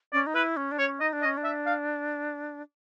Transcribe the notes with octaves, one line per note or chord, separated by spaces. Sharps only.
C#4 D5
D#4
E4 B4
C#4
D4
C#4 C#5
D#4 D#5
D4
D#5
C#4
D4
E5
F5